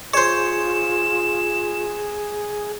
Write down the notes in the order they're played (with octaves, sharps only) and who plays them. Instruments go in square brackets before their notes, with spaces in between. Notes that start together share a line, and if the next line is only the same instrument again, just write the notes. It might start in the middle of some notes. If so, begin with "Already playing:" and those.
[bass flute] F4 [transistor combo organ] G#4 [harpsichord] C5 C#5 [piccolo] E7